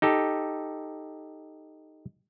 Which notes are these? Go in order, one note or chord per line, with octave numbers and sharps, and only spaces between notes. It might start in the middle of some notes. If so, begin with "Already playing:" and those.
D#4 G4 A4